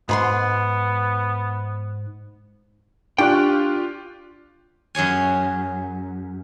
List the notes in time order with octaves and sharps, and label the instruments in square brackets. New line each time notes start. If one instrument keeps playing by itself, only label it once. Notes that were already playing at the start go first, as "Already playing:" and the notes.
[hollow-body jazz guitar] G#2 B5 C6 [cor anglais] B3
[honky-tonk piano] D4 C#6 F#6 [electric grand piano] F4 G4 [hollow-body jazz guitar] G5
[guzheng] F#2 G#4 C#5 G#5